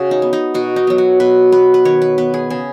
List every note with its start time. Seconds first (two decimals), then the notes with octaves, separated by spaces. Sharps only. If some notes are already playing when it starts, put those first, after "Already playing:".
Already playing: C#3 F#4 G#4
0.11 D#4
0.22 B3
0.33 D#4
0.54 B2 F#4
0.76 D#4
0.87 F#3 B3
0.98 F#4
1.20 B2 B4
1.52 B3 B4
1.74 B4
1.85 D#3 C#5
2.02 B4
2.18 B3 B4
2.34 G#4
2.50 C#3 G#4